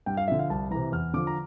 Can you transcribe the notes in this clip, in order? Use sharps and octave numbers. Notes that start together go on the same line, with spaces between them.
G2 G5
F5
D3 F3 E5
F5
C2 A5
C3 E3 A#5
E2 F6
D3 F3 D6
A#5